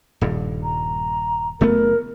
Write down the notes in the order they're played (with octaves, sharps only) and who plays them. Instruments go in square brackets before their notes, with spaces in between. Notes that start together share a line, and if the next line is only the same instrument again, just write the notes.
[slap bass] D#1 G2
[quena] A#5
[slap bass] F#1 A3 B3 [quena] A#4